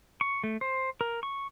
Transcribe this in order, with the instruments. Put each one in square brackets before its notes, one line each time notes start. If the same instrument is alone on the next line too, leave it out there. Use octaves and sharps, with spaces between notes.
[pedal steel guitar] C#6
A3
C5
A#4
C#6